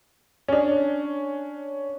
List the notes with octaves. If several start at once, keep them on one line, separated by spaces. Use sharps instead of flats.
C#4 D4